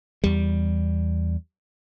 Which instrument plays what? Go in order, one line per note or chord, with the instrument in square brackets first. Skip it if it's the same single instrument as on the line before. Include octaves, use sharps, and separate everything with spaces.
[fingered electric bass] E2 G3